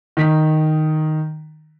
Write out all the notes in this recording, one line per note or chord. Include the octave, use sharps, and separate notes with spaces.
D#3 B6